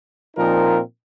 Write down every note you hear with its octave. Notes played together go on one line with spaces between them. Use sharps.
A#2 F3 C4 D#4 A#4